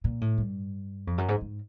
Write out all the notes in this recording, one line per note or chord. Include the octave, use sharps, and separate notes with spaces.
A#2
A2
G2
F2
F#2
G#2
G#2